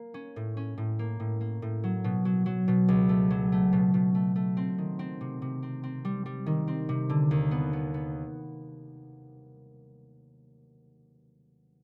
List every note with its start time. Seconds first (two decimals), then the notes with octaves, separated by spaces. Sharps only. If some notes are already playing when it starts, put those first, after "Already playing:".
Already playing: A#3
0.14 C#4
0.36 A2
0.57 C#4
0.78 A2
0.99 A#3
1.20 A2
1.41 A#3
1.62 A2
1.84 F#3
2.04 B2
2.25 F#3
2.46 F#3
2.68 B2
2.89 C#2
3.09 A3
3.31 F#3
3.52 A3
3.73 B2
3.94 B2
4.15 A3
4.36 A3
4.57 C4
4.78 D#3
4.99 C4
5.21 C3
5.42 C3
5.63 C4
5.83 C4
6.05 G3
6.26 G3
6.46 D#3
6.68 C4
6.89 C3
7.10 D3
7.31 D#2
7.51 B3
7.73 B3
7.94 B3